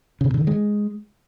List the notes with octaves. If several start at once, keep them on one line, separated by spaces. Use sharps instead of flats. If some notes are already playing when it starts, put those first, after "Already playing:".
C#3
B2
D3
D#3
G#3